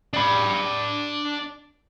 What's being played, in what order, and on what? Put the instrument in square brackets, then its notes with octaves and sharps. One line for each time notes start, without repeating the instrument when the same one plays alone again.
[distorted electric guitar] D4 B5